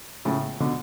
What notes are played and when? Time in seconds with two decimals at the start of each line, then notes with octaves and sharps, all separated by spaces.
0.25 A2 C#3
0.60 B2 D3